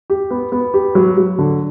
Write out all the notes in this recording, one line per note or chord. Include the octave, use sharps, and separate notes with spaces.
G4
B3
B3
G4
F#3
F#3
D3